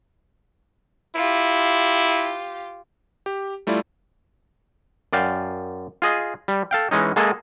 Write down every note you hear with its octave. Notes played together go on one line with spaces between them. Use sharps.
E4 F4 G4
G4
G3 A3 E4 F4 D5
F#2 D5 F5 G5
F4 G#4 D#5
G3
A4 F5 G5
E3 G#3 C#4 D#4
G#3 A#3 G#4 A4